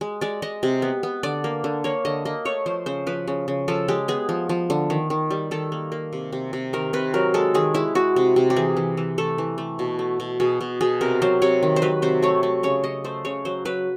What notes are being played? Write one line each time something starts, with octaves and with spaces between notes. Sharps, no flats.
G#3
G#3 D5
G#3 D#5
C3
B3
B3
D3 D5
A#3
D3
A#3 C#5
D3 D#5
A#3 D#5
A3 C#5
F3 C5
C#3 C5
F3 B4
C#3
C#3
F3 A4
G#3 G4
B3 G#4
F3
F3
D3
D#3
D#3
G3
D#3 A4
A#3
A#3
C3
C3
C3
D#3 A#4
C3 B4
F#3 A#4
G#3 A4
D#3 G#4
G#3 E4
G#3 F#4
C3
C3
G4
E3 G#4
E3
E3
A3 A4
E3
A3
B2
A3
B2
B2 G#4
B2
B2 G#4
C3 A#4
F#3 C5
C3 C#5
D#3
C5
F#3 B4
C3 C5
A3 C#5
A3
C#3 C#5
C#3 D#5
A3 C5
C#3 C#5
F#3 C5
F#3 B4